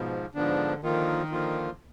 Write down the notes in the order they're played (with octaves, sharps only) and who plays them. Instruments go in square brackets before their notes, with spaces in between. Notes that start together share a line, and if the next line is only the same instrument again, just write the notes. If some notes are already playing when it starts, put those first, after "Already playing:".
Already playing: [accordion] G#2 F3 [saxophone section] B2
[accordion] G#2 F3 B3 D4 [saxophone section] D3
[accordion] D3 F3 A#3 F4 [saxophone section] D#3
[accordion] D3 F3 A#3 F4